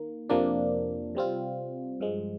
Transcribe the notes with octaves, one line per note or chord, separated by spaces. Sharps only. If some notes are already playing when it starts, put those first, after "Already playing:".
Already playing: D#3 A#3
F2 C3 F3 A#3 D4
C3 G3 C4 F4
G2 F3 G#3